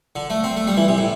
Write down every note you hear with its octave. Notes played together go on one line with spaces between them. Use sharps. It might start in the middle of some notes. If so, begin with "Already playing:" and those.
D3
A3
C4
A3
G3
E3
C3
A2